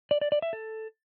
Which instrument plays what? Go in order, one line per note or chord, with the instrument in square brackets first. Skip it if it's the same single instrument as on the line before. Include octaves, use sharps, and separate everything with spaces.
[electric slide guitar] D5
D5
D5
E5
A4